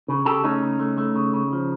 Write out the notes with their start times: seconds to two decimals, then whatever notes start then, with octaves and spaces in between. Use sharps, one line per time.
0.08 C#3
0.25 C#3 G4 A4
0.43 A3 C#4 D#4
0.62 C#3
0.80 A3
0.98 A3
1.15 C#3
1.33 C#3
1.53 F3